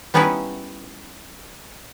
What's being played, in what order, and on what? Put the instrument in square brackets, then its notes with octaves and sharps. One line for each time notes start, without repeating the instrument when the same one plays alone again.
[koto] G3 B3 C#4 D#4 E4 B4